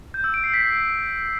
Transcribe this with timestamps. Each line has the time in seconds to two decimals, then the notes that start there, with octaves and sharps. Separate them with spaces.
0.14 G6
0.24 E6
0.34 D7
0.44 C7
0.54 B6